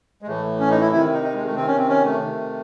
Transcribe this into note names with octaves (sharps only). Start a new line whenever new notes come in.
G#3
A2 E3 A3
C#4
D#4
E4
C3 D#3 E4
D#4
D#4
G#3
A3
C3 D#3 C4
C#4
C4
C#4
A3
C3 D#3